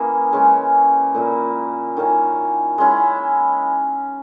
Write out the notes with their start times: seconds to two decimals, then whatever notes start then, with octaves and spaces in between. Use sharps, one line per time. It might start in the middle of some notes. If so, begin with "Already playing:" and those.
Already playing: E3 A#3 C#4 G#4
0.33 C#3 G#3 C#4
1.14 A#2 A#3 E4
1.97 D#3 A#3 C#4 E4
2.78 G#3 C#4 E4